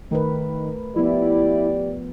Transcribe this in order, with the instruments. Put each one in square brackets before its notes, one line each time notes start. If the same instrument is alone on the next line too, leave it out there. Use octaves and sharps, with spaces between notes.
[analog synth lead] D#3 [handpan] A3 A#4 B4
[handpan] F3 B3 [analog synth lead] E4 [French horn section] G4 D5